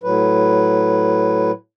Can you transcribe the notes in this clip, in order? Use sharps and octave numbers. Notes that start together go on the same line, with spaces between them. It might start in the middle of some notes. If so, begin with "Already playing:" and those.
A2 F#3 B4